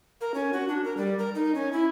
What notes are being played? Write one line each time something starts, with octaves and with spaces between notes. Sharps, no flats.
A#4
C#4
F#4
D4
A#4
G3
A#4
D#4
C#4
E4